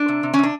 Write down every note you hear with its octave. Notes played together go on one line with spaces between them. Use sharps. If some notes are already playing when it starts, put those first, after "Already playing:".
Already playing: D4
C3
C3
C#4
C3 D4